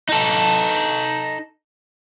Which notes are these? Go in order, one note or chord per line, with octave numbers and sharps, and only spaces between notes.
D#4 A4